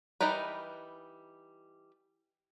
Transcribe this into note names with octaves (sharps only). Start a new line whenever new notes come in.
E3 G3 D#4 A#4 B4